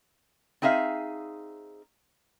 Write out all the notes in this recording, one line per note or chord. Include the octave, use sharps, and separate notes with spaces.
C4 D#4 G#4 E5 F5